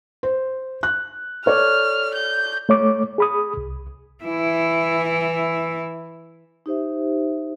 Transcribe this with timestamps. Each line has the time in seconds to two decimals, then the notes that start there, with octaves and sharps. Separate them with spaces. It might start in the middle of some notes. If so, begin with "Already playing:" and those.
0.23 C5
0.83 F#6
1.46 A4 C#5 D5 F6
2.15 G6
2.69 A3 C#5 D6
3.18 G#4 B5 D#6
3.57 C2
4.24 E3 E4
6.66 D#4 G4 C5 E5